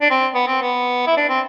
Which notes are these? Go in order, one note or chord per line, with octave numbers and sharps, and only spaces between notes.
D4
C4
B3
C4
B3
E4
D4
C4